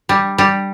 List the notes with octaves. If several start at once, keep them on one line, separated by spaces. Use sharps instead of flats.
G3
G3